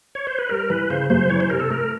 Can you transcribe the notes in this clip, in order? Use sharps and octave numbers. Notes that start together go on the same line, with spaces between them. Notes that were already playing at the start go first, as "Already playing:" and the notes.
C#5
C5
B4
G3 A#4
E3 B4
C#3 C5
F#2 C5
E3 C#5
C5
C3 A#4
A4
A3 A#4